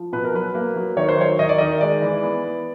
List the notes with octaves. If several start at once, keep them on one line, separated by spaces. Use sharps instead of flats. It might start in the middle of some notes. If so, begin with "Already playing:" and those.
Already playing: F3
B2 B4
A#4
F#3 B4
A#3
F#3
D#3 C#5
C5
F#3 C#5
D#3 D#5
D5
D#3 D#5
G#3 D5
E3
B3
B3